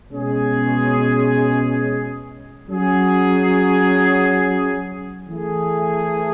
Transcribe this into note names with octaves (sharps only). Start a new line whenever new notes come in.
B2 G#3 C#4 G#4
F#3 C#4 G#4
E3 A3 E4 G#4